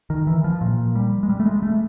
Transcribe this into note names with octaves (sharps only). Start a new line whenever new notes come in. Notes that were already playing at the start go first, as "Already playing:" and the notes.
D#3
E3
F3
A#2
G3
G#3
G3
A3
G#3
A3